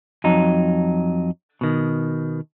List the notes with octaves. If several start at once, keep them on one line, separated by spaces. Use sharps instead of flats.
F2 F#3 D#4
B2 D#3